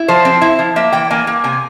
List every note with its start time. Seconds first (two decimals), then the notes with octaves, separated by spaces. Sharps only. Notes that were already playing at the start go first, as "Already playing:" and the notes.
Already playing: E4
0.08 F3 C5
0.25 C4
0.41 E4
0.59 F3
0.76 A#3 E5
0.92 E3 G5
1.11 A#3 G#5
1.27 A#3
1.44 C3 G#5